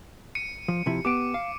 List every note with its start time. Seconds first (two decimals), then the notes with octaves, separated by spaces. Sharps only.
0.35 C#7 D#7
0.68 F3
0.86 C3 F3 E4
1.05 B3 G4 D6 D7
1.34 F5